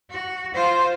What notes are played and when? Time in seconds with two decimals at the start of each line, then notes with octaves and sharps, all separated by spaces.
0.10 F#4
0.54 F4 C5